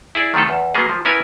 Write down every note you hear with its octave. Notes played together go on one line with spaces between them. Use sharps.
E4 G#4 D5
D#3 F3 A3 F4 A4
E2
F#3 A#3 B3 G#4
F3
B3 C#4 E4 A#4 B4 G#5